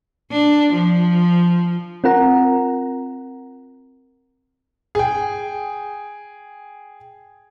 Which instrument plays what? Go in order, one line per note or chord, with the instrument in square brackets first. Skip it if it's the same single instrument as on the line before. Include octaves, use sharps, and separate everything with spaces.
[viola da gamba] D4
F3
[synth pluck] C4 F4 A#4 F#5 A#5
[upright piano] G#4 G5